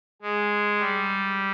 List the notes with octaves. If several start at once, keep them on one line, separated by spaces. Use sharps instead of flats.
G#3
G3